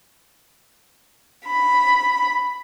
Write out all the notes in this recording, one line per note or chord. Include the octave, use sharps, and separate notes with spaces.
B5